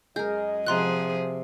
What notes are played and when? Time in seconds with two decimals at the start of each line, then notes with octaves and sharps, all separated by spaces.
0.16 F#2 G#3 G#4 A#4 D#5 G6
0.67 C3 F3 G#4 D5 F#5 A#5 C6 F#6